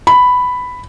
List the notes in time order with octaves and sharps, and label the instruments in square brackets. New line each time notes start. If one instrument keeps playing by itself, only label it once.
[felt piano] B5